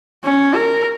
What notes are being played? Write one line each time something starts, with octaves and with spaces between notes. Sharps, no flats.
C#4
A#4